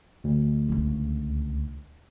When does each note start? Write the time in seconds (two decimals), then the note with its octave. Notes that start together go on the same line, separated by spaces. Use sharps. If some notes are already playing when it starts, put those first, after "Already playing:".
0.24 D2
0.69 C#2 C#3